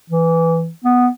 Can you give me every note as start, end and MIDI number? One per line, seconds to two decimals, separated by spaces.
0.10 0.70 52
0.84 1.08 59